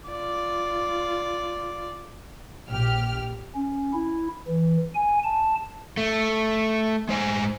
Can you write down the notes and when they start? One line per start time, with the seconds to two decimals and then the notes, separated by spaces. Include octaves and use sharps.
0.10 F4 D5
2.70 A#1 G4 F6
3.55 C#4
3.93 E4
4.47 E3
4.95 G#5
5.24 A5
5.97 A3
7.09 G#3 C5 G#5